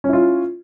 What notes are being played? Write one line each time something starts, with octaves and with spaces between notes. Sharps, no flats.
C#4 E4 F4